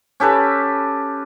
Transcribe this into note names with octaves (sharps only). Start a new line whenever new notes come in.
C#4 G4 A4 B4